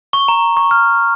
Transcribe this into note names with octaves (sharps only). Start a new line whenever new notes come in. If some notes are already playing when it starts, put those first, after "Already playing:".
C#6
A#5
C#6
F6